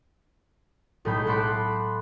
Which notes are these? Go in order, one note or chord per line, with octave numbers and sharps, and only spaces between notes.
B1 A2 G#3 A3 B5 G6
F#5 A5 B5 C6 D6